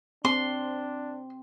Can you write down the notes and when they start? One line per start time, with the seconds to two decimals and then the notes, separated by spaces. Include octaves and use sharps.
0.25 C4 D4 C6